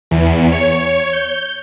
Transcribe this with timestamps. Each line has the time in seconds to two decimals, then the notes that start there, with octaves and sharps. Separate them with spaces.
0.11 E2
0.52 C#5
1.13 G6